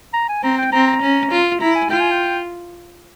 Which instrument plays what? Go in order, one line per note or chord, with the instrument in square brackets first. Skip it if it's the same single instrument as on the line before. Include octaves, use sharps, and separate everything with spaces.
[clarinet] A#5
G#5
[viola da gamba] C4 [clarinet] A#5
[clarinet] G5
[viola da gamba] C4 [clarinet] A#5
[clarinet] A#5
[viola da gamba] C#4
F4
[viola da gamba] E4 [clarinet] A#5
[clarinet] G#5
[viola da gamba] F4 [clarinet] G5
[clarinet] G#5
G5